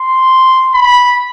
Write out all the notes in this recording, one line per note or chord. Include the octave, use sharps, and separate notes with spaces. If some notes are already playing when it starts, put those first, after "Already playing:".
Already playing: C6
B5